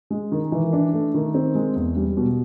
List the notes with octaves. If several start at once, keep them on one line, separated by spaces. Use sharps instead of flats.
G#3
D#3
E3
D4
A3
D#3
C4
G#3
E2
G3
B2